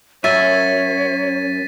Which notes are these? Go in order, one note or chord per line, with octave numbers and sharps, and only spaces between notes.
F#2 C#5 E5 A6 B6 D#7